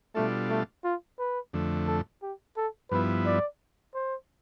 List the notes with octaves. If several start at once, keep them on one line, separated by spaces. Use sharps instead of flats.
B2 G3 A3 D4 F4 A4
A3
F4
B4
F2 D3 A3
A4
G4
A4
G2 F3 B3 E4 B4
D5
C5